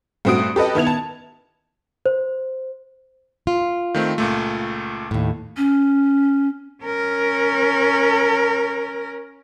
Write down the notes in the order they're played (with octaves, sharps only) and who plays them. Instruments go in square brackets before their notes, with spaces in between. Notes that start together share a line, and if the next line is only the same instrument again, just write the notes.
[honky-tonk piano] G2 A3 C4 F#4 D#6 D7
G4 A4 B4 D#5
D#3 B3 E4 G#6 F7
A5
[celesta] C5
[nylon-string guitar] F4
[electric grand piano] D#3 A3 C4
C#2 A#2 A3
[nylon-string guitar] D#2 A2
[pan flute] C#4
[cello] C#4 A#4